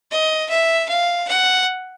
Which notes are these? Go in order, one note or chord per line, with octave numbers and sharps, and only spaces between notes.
D#5
E5
F5
F#5